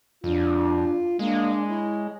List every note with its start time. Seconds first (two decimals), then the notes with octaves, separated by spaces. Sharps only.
0.24 F2 D4 F4
1.19 G#3 A#3 D4
1.68 E4 C#5